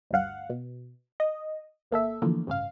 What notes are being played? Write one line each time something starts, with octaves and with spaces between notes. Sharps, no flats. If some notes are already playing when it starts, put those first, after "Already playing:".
G1 D2 G2 F5 F#5
B2
D#5
G#1 A#3 A4 E5
D3 E3 F3 A3 A#3
A1 G2 C#3 F5